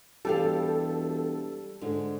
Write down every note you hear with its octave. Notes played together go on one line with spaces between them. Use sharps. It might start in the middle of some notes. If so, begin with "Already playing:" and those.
E1 G3 G4 A4 F5
G#2 D3